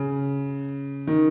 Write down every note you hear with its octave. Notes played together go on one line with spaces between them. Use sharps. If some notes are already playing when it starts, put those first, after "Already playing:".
Already playing: C#3
D#3